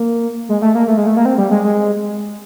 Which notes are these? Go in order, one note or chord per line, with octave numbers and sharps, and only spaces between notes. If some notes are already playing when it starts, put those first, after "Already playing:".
Already playing: A#3
G#3
A3
A#3
A3
G#3
A3
A#3
C4
G3
G#3
G#3